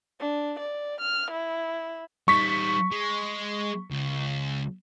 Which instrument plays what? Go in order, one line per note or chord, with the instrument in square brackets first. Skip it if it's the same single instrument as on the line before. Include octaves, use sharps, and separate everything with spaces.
[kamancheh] D4
D5
F6
E4
[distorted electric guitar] G3 D#4 [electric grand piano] C#6 B6
[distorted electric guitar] G#3
C#2